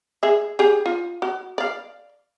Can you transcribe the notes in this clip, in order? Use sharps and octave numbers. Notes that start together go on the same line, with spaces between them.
G#4 E5
G4 G#4
F4
F#4
D5 F5